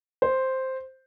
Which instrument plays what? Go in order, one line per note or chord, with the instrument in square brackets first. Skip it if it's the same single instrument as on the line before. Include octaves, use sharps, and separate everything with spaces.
[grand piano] C5